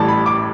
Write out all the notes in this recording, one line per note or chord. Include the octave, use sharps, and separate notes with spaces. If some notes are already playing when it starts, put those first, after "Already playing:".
Already playing: A1 A2 E3 G3 A5
B5
D6